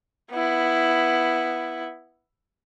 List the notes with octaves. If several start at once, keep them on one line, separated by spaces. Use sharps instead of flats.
B3 E4